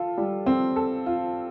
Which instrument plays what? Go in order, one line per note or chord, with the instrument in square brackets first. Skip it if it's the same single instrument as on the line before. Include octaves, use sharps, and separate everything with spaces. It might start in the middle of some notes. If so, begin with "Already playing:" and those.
Already playing: [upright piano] F4 A4
G3
C4
A4
F4